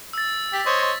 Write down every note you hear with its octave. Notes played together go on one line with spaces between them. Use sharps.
E6 A6
G4 B6
C5 C#5 D#5